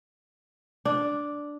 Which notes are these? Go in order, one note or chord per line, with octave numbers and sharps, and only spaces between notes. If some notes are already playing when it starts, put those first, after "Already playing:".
D4